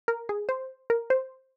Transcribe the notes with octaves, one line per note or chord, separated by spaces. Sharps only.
A#4
G#4
C5
A#4
C5